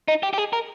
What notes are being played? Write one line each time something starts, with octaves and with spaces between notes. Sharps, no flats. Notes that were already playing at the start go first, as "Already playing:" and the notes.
D#4
G4
G4
G#4
A#4